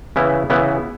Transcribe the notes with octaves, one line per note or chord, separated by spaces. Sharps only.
C#3 E3 B3 E4
C#3 E3 B3 E4